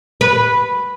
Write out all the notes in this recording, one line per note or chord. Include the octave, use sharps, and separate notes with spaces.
B4